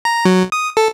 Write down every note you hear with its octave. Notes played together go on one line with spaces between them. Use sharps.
A#5
F#3
D#6
A4